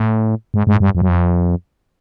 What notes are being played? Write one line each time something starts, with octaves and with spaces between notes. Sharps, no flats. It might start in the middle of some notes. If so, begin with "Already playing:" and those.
Already playing: A2
G#2
G#2
G2
F2
F#2
F2